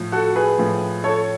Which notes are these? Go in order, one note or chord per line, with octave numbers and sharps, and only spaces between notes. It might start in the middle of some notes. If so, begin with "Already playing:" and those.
Already playing: A2 F3
F#4 A4
G#4 B4
A2 F3
A4 C#5